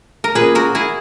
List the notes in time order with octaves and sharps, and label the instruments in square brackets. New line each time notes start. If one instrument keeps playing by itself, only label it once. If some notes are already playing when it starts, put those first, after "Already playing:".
[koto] A#4
[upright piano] A#2 A#3 C#4 [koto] G#4 B4
[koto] F#4 A#4
E4 G#4